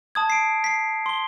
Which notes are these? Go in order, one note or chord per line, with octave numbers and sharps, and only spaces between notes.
A5 D#6 G#6
C7 D7
B6 C7
C6 G7